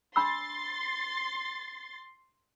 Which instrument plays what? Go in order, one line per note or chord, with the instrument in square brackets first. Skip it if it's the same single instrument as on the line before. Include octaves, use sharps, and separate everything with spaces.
[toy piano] D4 B5 E6 [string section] C6 A6